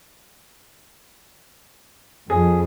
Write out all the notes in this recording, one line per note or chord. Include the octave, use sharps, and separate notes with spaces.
F2 G#4